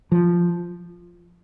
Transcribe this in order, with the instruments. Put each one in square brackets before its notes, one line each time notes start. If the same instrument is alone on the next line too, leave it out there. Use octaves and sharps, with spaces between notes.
[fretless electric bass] F3